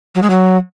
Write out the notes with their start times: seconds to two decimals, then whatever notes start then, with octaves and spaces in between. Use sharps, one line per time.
0.15 F#3
0.22 G#3
0.30 F#3